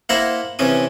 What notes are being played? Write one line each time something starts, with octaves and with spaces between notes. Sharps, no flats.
A#3 E4 C5 E5 F#5 A#5
C3 E3 C#4 D#6